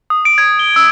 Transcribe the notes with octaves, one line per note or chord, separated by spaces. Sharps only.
D#6
D7
G#6
G7
E6